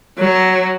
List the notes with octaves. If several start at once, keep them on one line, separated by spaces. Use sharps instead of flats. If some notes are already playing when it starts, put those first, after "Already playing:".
F#3